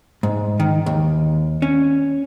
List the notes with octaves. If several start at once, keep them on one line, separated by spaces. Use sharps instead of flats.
G#2
D#3
D#2
C#4